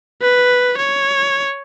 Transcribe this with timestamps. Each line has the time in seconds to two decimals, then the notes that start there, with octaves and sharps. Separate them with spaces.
0.22 B4
0.78 C#5